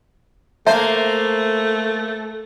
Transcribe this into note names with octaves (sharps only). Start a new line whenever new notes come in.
A3 A#3 C5 E5 A5